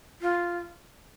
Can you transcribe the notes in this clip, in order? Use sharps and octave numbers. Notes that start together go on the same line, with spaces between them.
F4